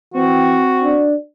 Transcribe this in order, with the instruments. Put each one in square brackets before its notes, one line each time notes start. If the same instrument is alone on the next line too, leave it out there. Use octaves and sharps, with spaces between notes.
[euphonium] E3 [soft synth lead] C4 [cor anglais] F#4
[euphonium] D4